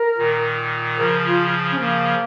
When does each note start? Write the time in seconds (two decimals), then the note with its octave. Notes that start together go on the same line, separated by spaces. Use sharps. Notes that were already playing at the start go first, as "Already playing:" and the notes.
Already playing: A#4
0.18 A#2 D#3
0.98 C#3 F3 A#4
1.25 F4
1.72 C#4
1.78 C#3 F3 A#3